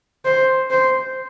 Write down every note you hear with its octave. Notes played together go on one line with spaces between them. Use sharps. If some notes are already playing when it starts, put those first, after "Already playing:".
C5
C5